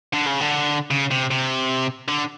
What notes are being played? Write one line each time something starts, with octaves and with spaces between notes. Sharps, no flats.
D3
C#3
D3
C#3
C3
C3
D3